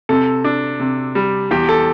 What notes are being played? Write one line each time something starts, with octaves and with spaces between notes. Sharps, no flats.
C3 A4
D4
C3
G3
E2 G4
A4